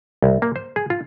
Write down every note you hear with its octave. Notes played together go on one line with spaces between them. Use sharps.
C2
A#3
C5
G#4
F4